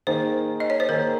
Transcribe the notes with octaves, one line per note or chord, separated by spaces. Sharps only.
D#3 A#3 D#4 G#4 C5
D#5
C#5
C5
D#3 A#3 D#4 G#4 A#4